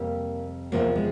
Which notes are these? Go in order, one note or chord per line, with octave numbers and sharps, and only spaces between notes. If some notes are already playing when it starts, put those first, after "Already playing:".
Already playing: F2 C3 G3 A#3
E2 C3 F3 A#3
G#3